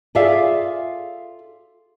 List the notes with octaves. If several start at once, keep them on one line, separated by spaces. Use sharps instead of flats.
F4 G#4 A4 D5 E5 F5